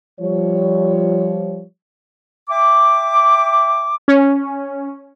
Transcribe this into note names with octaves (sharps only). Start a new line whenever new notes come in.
F3 G3 C#5
E5 G5 D6
C#4